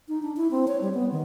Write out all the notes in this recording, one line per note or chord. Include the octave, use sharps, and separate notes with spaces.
D#4
D4
E4
C4
C#5
G3
B3
D#3